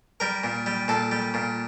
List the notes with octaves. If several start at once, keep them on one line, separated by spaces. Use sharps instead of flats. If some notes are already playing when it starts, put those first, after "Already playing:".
G3 A#4
A#2
G3
A#2 A4
G3
A#2